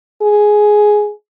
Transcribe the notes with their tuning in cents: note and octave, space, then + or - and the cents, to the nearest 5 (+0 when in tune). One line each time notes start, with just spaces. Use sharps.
G#4 +5